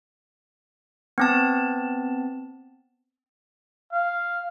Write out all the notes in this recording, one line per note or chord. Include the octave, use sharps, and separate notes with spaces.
B3 C4 A5
F5